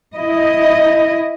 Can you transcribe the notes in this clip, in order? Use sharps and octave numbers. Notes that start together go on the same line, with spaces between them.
E4 D#5